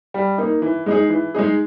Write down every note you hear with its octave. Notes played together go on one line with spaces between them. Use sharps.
G3
A#3 D#4
E3
G#3 D#4 G#4
E3
G#3 D#4 G#4